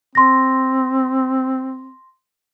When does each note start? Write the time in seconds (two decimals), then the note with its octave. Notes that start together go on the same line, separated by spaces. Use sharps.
0.15 C4 C6 A#6